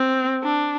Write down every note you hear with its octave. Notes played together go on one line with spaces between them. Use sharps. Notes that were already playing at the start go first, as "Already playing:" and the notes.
Already playing: C4
D4